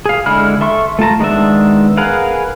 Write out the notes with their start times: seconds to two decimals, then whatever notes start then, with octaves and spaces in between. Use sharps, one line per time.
0.06 G#4 F5
0.26 D3 G#3 E4 B5 F6
0.61 A4 E5 C6 C#6
0.99 A3 F4 A5 A#5
1.20 D#3 G#3 B3 D4 E5
1.97 G#4 A#4 B4 F5 F#5